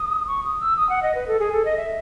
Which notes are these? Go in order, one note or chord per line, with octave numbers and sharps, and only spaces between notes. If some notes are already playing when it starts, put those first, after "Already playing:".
Already playing: D#6
C#6
D#6
E6
D#6
F#5
D#5
B4
A4
G#4
A4
D#5
E5